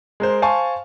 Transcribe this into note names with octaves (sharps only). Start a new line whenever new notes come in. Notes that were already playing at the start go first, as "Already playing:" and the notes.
G#3 A#4 C5
C5 F5 G#5 A5 C6 C#6